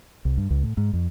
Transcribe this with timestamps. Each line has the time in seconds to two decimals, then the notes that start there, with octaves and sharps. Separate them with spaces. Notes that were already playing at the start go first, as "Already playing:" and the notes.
0.25 C2
0.37 G2
0.50 C#2
0.63 A2
0.77 G#2
0.93 F2